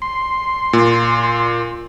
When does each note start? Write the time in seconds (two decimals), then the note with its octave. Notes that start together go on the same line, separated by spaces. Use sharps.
0.02 C6
0.73 A#2